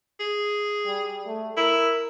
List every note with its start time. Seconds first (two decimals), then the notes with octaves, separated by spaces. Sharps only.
0.20 G#4
0.86 G3
1.26 A3
1.57 E4 A#4